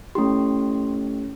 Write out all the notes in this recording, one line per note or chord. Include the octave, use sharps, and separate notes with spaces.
A3 C#4 E4 G4 C6